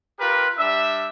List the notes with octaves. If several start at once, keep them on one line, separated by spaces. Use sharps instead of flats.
F4 G4 A#4 B4
G3 D4 E5